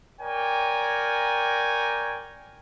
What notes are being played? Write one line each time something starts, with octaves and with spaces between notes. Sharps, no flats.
A#4 C#5 D5 G5 G#5 A#5